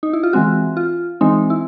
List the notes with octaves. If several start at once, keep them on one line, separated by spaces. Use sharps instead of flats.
D#4
E4
F4
E3 G#3 C4 F#4
F4
E3 G#3 C4 D#4
E4